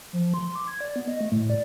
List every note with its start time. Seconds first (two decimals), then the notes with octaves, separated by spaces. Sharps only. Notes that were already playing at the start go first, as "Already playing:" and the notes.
0.13 F3
0.34 C6
0.55 D6
0.68 G#6
0.81 D5
0.96 B3
1.08 D#5
1.21 A3
1.32 A2
1.50 D5